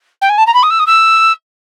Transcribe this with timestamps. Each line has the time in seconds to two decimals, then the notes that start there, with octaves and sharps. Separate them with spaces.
0.22 G5
0.29 G#5
0.38 A5
0.47 A#5
0.54 B5
0.63 D#6
0.70 E6
0.79 D#6
0.87 E6